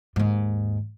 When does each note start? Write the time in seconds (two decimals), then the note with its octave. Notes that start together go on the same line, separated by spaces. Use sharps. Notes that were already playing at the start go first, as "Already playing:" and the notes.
0.16 D#2 G#2